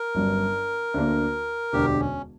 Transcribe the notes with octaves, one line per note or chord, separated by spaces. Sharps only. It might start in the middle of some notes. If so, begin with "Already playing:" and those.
Already playing: A#4
G1 G2 F#3 C#4
D2 D3 A#3
E1 D2 D3 G4
C#4